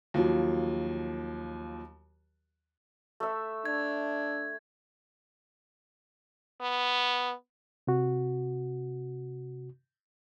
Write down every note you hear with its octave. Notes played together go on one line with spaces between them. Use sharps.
D#2 F3 F#3
A3 E5
D4 G#6
B3
C3 F#4